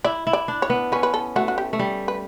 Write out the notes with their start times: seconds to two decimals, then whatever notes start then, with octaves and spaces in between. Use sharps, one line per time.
0.04 E4 D5
0.27 E4
0.33 D5
0.48 D4
0.62 C#5
0.70 B3
0.92 C#4 B4
1.03 B4
1.14 A4
1.36 A3 F#4
1.48 F#4
1.58 G4
1.73 A3
1.79 G3
2.08 B4